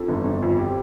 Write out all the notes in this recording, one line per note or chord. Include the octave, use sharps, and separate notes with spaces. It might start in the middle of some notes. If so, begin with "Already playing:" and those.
Already playing: F2 A4
G1
G1
F2
G4